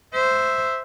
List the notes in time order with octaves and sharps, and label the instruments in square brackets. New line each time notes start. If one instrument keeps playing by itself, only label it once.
[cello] C5 [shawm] E5